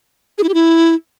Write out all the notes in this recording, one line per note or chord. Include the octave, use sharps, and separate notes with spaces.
G#4
E4
G4
E4